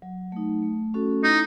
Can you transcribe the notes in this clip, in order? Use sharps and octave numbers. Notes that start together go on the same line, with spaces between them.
F#3
A3 D#4
A3
C#4 F#4 A4
D#4 E4